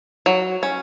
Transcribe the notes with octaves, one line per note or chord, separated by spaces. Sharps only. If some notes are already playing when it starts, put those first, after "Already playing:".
F#3
C#4